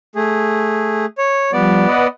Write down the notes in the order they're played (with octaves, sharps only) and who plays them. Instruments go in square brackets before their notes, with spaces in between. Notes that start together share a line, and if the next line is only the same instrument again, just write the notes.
[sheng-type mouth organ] A3 G#4
C#5
[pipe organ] F3 G3 [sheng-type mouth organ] B3 D5
[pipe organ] B4 D#5 F#5